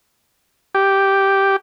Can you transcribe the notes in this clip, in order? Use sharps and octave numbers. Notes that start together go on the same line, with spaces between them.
G4